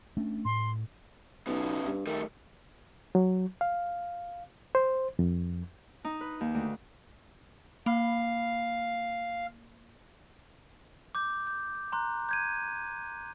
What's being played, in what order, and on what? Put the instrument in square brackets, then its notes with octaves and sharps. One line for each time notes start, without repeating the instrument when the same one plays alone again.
[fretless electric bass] A3 C#4 D4
[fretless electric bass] A2 [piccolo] C6
[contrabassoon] B1 [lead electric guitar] C#3 B3
[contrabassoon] G2
[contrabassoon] D#3 [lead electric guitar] G3 A3
[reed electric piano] F#3
F5
C5
F2
[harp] D#4
B4
D#2
D2
[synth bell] A#3 B5 [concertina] F5
[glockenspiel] D6 G6
G6
A#5 C6 F#6
G6 G#6 D#7